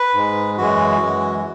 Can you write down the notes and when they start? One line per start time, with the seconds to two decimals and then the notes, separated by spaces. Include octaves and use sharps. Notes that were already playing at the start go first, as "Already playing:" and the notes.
Already playing: B4
0.14 G#2 G#3
0.58 F#2 E3 G#3 F#4
1.01 F#2 E3 G#3